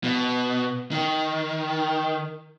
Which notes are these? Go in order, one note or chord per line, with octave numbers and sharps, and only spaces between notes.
B2
D#3